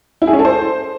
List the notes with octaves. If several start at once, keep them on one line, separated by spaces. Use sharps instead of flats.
E4
G#4
C#4
A4
C5